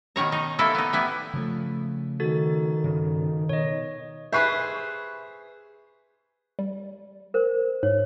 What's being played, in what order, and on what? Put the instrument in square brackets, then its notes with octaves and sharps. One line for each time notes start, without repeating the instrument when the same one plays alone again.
[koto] B2 D#3 C#5 A#5
D#4
A#3 B3 E4 A4
B3 D#4
G3 B3 E4
[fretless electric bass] C#3 F3 A3
[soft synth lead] D#3 [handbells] F#4 A4 A6
[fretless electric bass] G2 C#3
[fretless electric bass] B2 [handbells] C#5 D#5
[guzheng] G#4 B4 C5 [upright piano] E5 C#6 C7
[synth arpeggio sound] G3
[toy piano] A#4 C5
[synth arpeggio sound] G#2 [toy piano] C#5